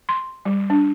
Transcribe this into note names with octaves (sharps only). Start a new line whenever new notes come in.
C6
G3
D4